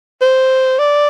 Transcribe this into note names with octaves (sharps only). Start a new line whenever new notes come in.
C5
D5